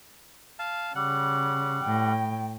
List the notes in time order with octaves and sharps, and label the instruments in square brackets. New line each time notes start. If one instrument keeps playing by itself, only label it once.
[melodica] F5 A5
[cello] C#3 [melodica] G3 F#5
[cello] A2 G5